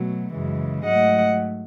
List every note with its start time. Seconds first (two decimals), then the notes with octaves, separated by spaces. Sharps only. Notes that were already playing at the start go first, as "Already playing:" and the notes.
Already playing: B2 F#3 A3
0.33 F#2 C#3 E3 G#3
0.85 G#2 F#3 A3 D#5 F#5